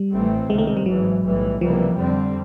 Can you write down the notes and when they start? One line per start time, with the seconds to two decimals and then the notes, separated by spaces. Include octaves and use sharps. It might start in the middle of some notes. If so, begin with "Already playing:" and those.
Already playing: G3
0.12 A1 A2 E3 A3 C4
0.50 C#2 C3 D#3 G#3
0.58 A3
0.67 G#3
0.77 G3
0.86 G#1 G#2 E3 F#3
1.24 B1 A2 E3 G3
1.61 C#2 C3 E3 F3 G3 A#3
1.98 F2 D3 G3 C4